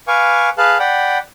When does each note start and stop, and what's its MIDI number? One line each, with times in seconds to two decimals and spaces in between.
0.08 0.50 71
0.08 0.50 77
0.08 0.50 80
0.08 0.50 85
0.08 0.50 86
0.58 0.78 68
0.58 0.78 71
0.58 0.78 77
0.58 0.78 81
0.58 0.78 90
0.79 1.19 74
0.79 1.19 78
0.79 1.19 79
0.79 1.19 83